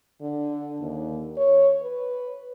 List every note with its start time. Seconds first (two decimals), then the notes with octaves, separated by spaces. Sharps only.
0.21 D3
0.81 D#2
1.37 C#5
1.83 B4